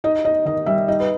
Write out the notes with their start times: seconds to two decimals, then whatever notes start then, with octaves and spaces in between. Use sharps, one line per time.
0.04 D#4 D#5
0.24 D#4 D#5
0.45 D#3 D#5
0.66 G3 E5
0.88 D#4 D#5
1.00 B4